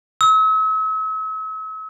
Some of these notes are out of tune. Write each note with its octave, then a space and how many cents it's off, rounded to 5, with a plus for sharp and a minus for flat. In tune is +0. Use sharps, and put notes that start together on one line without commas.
E6 -45